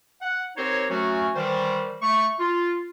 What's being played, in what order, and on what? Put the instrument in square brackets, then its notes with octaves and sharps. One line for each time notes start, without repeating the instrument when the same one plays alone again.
[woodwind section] F#5
C4 D#4 G4 A#4 C5 C#5
F#3 A3 C#4 F#4
D#3 E3 G3 C5
A3 C#6
F4